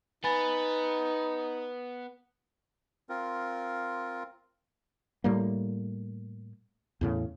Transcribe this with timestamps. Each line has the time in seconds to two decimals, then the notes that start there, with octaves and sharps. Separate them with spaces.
0.24 B3 D#4 G#5 B5 A6
3.09 C4 F4 A#4
5.24 A2 G3 A#3
7.01 E2 A2 C#3